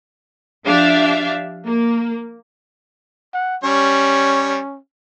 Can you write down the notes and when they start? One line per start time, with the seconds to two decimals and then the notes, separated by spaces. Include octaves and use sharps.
0.66 F3 D4 G4 D5 E5 F5
1.65 A#3
3.34 F#5
3.64 G3 C#4 C#5